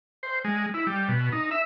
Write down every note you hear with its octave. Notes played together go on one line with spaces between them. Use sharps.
C5
G#3
E4
G3
B2
D#4
E5